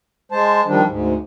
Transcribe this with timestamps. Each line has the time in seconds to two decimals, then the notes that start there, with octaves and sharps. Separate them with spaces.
0.32 G#3 C5 A5
0.66 D#3 F3 G3 D4
0.87 D2 G#2